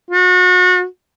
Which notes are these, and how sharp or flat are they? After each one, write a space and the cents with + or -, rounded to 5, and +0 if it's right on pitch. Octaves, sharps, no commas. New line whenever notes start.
F#4 -30